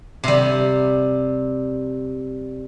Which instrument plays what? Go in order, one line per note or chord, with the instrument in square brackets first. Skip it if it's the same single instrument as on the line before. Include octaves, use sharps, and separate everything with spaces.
[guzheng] C3 G3